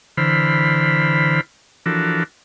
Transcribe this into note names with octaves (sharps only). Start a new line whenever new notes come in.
D3 E3 C5 B5 F6
E3 F3 D4 F#4 A4 A#4